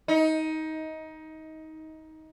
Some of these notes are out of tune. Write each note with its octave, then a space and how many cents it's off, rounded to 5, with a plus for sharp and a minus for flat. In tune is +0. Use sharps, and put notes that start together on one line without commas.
D#4 +20